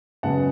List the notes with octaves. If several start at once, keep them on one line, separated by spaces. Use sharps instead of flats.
F#2 C#3 G#3 B3 F#5 A5